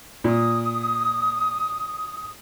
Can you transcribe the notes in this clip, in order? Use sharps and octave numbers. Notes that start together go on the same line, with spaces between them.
A#2 D#6